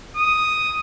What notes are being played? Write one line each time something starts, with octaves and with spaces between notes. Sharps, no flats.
D#6